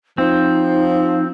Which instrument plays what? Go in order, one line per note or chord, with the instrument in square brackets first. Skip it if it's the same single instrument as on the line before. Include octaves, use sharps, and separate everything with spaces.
[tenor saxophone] F3 [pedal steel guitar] C4 [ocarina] D#4